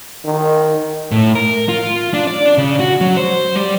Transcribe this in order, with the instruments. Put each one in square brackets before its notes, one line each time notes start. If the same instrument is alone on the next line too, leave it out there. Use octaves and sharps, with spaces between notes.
[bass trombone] D#3
[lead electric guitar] A2
A#4
F4
D4
D5
D4
C#3
F#4
F#3
C5
G3